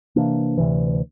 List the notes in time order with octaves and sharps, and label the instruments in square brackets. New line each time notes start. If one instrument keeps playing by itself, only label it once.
[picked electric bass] C3 E3 A#3 D4
D2 C3 E3